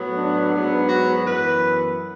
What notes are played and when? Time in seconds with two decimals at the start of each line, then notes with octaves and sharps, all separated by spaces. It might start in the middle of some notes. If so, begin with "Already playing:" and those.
Already playing: A2 F#3 B3
0.17 D4
0.53 G#2 F#3 B3
0.88 F#4
1.24 F#2 E3 B3 B4